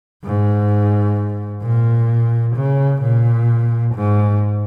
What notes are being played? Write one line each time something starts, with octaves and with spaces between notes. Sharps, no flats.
G#2
A#2
C#3
A#2
G#2